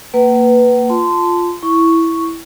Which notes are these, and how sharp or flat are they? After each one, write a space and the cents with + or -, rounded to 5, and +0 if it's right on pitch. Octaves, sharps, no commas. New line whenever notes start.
A#3 -15 B4 +0 F#5 +35
F4 +0 A5 +0 C6 -20
E4 +0 C#6 +0